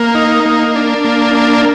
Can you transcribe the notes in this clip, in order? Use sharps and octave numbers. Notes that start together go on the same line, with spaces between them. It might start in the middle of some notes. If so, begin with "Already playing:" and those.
Already playing: A#3
D#4
A#3
D4
A#3
D4